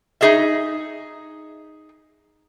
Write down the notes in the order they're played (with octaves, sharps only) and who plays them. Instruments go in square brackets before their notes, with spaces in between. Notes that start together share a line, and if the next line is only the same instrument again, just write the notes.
[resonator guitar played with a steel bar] D#4 F#4 G#4 D#5 E5